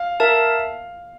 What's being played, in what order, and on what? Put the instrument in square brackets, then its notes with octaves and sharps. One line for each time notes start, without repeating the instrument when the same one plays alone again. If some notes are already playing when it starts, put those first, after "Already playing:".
Already playing: [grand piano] F5
[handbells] A#4 E5 A5